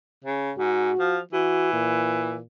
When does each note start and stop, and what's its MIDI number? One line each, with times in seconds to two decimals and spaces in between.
0.24 0.52 49
0.58 0.91 44
0.58 1.18 66
0.99 1.20 53
1.33 2.38 52
1.33 1.72 66
1.73 2.42 46